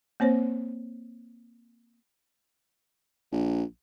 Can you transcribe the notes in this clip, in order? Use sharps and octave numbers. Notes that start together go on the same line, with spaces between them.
A#3 C4 C5 C#5
A#1